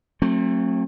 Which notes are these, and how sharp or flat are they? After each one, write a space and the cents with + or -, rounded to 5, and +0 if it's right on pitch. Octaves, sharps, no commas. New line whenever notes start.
F#3 -25 A3 +20 C4 +40